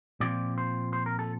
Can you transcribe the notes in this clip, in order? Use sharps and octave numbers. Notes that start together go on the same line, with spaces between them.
A#2 F3 C4 D5
C5
C5
A#4
A4